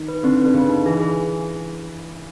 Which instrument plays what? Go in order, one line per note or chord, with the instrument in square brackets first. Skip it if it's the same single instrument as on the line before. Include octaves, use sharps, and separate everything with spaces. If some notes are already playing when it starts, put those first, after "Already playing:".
Already playing: [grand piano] D#3
[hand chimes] B4
[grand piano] D3 [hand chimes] C4
[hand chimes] B4
[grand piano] D3
[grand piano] C#3 [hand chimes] B4
[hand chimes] D#4
[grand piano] E3 [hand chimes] G#4
[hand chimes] G#4